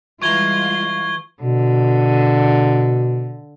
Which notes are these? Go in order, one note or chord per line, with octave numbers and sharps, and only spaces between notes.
E3 G3 G#3 F4 A#5 C#6 G#6 G7
B2 D3